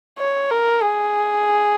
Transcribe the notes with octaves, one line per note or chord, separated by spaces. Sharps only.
C#5
A#4
G#4